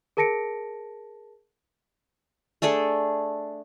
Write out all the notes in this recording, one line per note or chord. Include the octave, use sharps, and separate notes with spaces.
G#4 A#4 A5 A#6 C#7 D7
A3 D4 G#4 A4